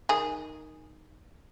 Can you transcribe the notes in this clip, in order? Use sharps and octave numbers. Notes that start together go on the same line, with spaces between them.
D#3 G#4